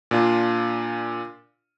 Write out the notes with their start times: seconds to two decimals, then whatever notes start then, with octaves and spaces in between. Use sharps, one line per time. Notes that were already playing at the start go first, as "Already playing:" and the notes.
0.11 A#2 D4 F4